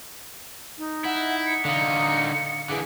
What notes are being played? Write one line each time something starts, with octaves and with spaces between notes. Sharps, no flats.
D#4
E4 F#5
C#7
D3 D#4 F5
D3 E3 G#4